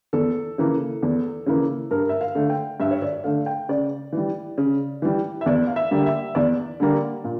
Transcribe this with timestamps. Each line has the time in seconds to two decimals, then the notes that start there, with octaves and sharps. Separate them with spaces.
0.13 E2 A4
0.58 C#3 E3 A#3
1.03 E2
1.46 C#3 E3 A#3
1.91 G2 A#4
2.09 E5
2.21 F5
2.35 D3 A3
2.50 G5
2.80 G2 E5
2.91 C#5
3.02 D5
3.24 D3 A3 F5
3.46 G5
3.69 C#3 D5
4.13 E3 G3
4.58 C#3
5.02 E3 G3
5.41 E5
5.46 E2 D5
5.67 F5
5.76 E5
5.91 D3 G3 A#3
6.06 E5
6.35 E2 D5
6.80 D3 G3 A#3
7.24 A#2